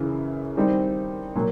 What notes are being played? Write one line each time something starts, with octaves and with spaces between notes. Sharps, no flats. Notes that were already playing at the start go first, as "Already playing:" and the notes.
Already playing: F#2 C#3 E3
D#3 G3 C4 D#4
A#2 F#3